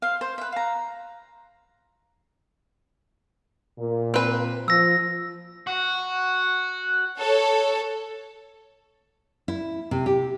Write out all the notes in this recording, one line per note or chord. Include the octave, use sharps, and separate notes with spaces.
C5 F5
C5
B4 E5
F5 A#5
A#2
C4 B4
F3 E6 A#6
F#4
A4 C#5
E4
C3
G4